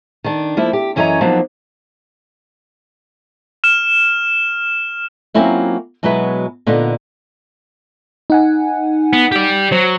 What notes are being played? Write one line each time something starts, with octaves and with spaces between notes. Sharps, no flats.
D#3 D4
F3 A#3 E4
G4
F#2 E3 C#4 C#5 D#5 A#5
F3 F#3 A#3 B3 D4 D#4
F6 E7
F#3 A#3 C4 C#4 E4 F4
B2 F#3 G#3 B3 E4 B4
A#2 D3 B3 D4 D#4
D#4 F#5 G#5
B3
G4 D5
F#3 C5